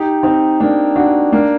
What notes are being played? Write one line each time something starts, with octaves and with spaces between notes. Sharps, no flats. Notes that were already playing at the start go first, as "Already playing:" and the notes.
Already playing: D#4 G4
C4 D#4
A#3 D4
D4 F#4
A#3 D4